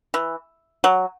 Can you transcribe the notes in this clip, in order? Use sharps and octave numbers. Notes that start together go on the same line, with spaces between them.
E3
F#3